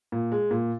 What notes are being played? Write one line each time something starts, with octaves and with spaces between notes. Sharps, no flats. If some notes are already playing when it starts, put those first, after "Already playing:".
A#2
G#3
A#2